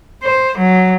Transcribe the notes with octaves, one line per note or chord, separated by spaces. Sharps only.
C5
F#3